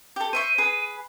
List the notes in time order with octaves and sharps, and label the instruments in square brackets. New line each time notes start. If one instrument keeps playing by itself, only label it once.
[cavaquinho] G4 A4
[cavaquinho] C5 E5 C#6 [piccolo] D#7
[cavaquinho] G#4 B4